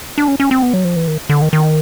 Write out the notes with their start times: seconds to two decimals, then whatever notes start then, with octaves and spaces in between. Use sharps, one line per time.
0.18 D4
0.28 C#4
0.40 C#4
0.51 C4
0.62 B3
0.74 F#3
0.85 F3
0.96 E3
1.08 D#3
1.30 D3
1.42 D#3
1.53 D#3